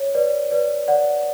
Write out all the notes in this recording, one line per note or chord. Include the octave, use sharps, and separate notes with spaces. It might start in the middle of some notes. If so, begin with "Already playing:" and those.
Already playing: C#5
B4 D5
B4 D5
D5 F#5